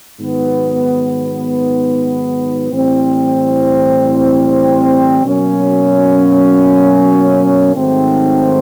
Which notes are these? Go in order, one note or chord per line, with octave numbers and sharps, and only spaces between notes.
G#2 D#3 F#3 B3
A2 E3 G3 C4
B2 F#3 A#3 C#4
G#2 D#3 F#3 A3 C4